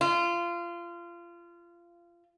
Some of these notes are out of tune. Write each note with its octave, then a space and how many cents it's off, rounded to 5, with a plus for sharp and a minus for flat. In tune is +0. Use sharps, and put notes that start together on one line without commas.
F4 -25